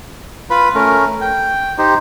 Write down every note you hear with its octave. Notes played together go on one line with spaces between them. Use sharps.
F4 B4 B5
A3 C#4 A#4
G5
D#4 G4 C5